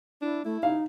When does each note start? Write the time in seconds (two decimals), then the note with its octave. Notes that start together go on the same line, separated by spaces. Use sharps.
0.22 D4 E4
0.45 A3 E4
0.63 D#4 F5